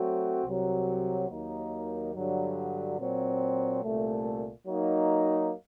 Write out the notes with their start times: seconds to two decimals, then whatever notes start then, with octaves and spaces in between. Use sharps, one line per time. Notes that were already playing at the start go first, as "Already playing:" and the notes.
Already playing: F#3 A3 C4 F#4
0.44 C2 C3 F#3
1.29 D#2 D#3 F#3 A#3 D#4
2.13 G2 D3 F#3
2.97 A#2 F#3 C4
3.82 C2 A#2 A3
4.67 F#3 A#3 D#4